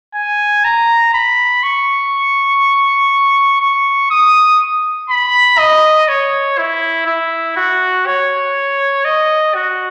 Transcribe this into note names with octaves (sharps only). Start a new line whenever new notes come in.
G#5
A#5
B5
C#6
C#6
D#6
B5
D#5
C#5
E4
E4
F#4
C#5
D#5
F#4